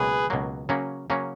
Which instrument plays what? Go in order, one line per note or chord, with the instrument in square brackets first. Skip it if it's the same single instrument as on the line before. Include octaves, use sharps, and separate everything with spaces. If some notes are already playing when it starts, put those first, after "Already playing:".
Already playing: [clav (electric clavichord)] C#2 B2 F#3 A#3 [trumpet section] G#4 B4
[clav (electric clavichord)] C#2 B2 F#3 A#3
C#3 F#3 A#3 C#4
C#3 F#3 A#3 C#4